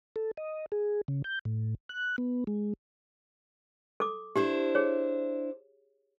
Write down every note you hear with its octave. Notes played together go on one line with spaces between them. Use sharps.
A4
D#5
G#4
C#3
G6
A2
F#6
B3
G#3
A4 D6
D4 E4 G4 C5
G#4 C#5